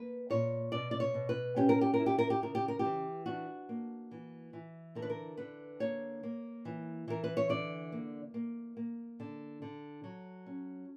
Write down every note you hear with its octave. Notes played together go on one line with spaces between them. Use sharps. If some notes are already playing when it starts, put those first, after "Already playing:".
Already playing: A#3 B4
A#2 C#5
B2 D5
D5
C#5
B2
B4
C#4 G4
A#4
G4
A#4
E4
G4
A#4
G4
C#3 A#4
G4
A#4
E3 G4
D4 F#4
A#3
E3
E3
D3 A#4
B4
A#4
D3 B4
A#3 C#5
A#3
E3
E3 A#4
B4
C#5
D3 D5
A#3
A#3
A#3
D3
D3
F#3
C#4